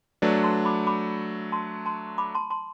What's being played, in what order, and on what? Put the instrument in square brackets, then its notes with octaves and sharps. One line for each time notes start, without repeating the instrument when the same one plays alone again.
[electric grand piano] F#3 A3 D4 [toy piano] B4 D5
[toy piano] A5 C6
B5 D6
B5 D6
A5 C6
A5 C6
B5 D6
A5 C6
A5 C6